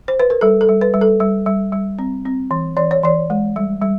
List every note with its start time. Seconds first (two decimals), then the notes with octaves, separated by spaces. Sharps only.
0.08 C5
0.20 B4
0.30 A#4
0.41 G3 A4
0.61 A4
0.69 G3
0.81 B4
0.94 G3
1.01 A4
1.20 G3
1.46 G3
1.72 G3
1.99 C4
2.26 C4
2.51 E3
2.77 E3 D5
2.91 C#5
3.03 E3 D5
3.30 G#3
3.56 G3
3.82 G3